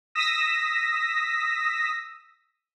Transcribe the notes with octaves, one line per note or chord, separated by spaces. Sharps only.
D#6 E6 A#6 B6